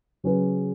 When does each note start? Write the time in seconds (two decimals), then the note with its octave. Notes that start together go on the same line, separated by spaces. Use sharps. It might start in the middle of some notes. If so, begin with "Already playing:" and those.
0.24 C#3 F#3 C#4 G#4 B4